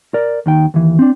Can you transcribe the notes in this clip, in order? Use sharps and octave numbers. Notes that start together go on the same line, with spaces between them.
A#4 D5
D#2 D#3 G5
D#2 E3
C4 D4